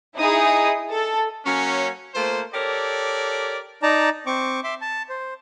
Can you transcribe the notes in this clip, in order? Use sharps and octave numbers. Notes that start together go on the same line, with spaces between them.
D#4 E4 G#4 D#6
A4
F#3 A#3 C#4
A3 A#3 F4 C5
G4 A4 A#4 C#5 D5
D#4 D5 A5 A#5
C4 C#6 D6
E5 C6 D6
A5
C5